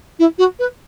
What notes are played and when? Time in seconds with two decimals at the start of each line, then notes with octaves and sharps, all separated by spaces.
0.19 E4
0.38 F#4
0.59 B4